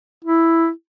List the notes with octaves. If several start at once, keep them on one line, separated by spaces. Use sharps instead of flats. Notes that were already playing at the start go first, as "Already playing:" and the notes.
E4